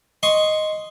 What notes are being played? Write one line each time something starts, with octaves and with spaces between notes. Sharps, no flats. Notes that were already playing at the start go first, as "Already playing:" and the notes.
D#5 C6 C#6